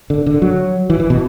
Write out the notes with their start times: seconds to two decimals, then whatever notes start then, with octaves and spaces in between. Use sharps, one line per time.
0.10 D3
0.26 D3
0.42 F#3
0.90 E3
1.00 E3
1.10 B2